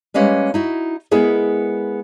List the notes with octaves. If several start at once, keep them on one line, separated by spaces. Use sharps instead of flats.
G3 G#3 A#3 C#4 B4
D#4 E4 F#4
G#3 B3 E4 G#4 A#4